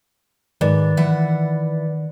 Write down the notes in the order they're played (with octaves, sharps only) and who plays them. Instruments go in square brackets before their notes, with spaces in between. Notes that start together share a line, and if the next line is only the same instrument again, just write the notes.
[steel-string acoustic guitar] G#2 [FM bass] D#3 [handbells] B4 D5
[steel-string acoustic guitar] E3 E5 F#5